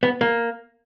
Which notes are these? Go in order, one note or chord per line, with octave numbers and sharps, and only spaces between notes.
B3
A#3